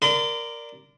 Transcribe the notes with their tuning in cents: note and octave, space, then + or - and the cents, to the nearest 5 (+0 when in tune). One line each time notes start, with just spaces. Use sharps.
A#4 +0 D5 +0 C6 -40